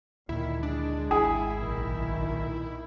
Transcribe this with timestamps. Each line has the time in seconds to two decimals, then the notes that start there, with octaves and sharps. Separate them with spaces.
0.29 D2 A#2 D#3 E4
0.63 G#3 D4
1.11 G#1 E4 G#4
1.56 B1 A#2 D#3